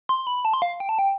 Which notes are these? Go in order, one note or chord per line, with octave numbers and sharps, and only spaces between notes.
C6
B5
A5
C6
F5
G5
A5
G5